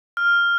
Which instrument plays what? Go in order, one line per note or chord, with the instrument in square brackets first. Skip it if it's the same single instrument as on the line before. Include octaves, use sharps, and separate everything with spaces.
[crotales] F6